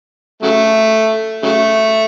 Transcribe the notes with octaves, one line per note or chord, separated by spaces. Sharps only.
C#3 F#3 A3
C#3 F#3 A3